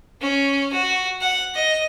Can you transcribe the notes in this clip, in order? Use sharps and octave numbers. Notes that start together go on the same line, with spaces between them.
C#4
F#4
F#5
D#5